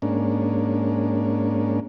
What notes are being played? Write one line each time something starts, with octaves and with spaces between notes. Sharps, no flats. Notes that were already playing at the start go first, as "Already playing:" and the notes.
G#2 A#3 C#4 D4